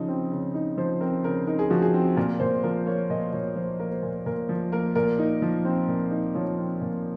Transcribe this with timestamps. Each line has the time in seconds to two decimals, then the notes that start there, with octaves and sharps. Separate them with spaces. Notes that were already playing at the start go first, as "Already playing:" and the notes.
Already playing: C#3 F3 D#4
0.08 C4
0.32 C#3
0.54 D#4
0.77 F3 C5
1.01 C4 A#4
1.24 C#3 A#4
1.47 D#4 A#4
1.59 G#4
1.70 F3 F#4
1.82 G#4
1.94 C4
2.17 A#2 A#4
2.40 A#2 C5
2.63 F3 A#4
2.86 A#3 C#5
3.10 A#2 D#5
3.33 A#2 C#5
3.56 F3 C5
3.79 A#3 A#4
3.91 C5
4.03 A#2
4.26 A#2 A#4
4.49 F3
4.72 A#3 A#4
4.95 A#2 A#4
5.19 D#4
5.42 F3
5.65 C4
5.88 A#2
6.11 D#4
6.35 F3 C#5
6.58 C4
6.81 A#2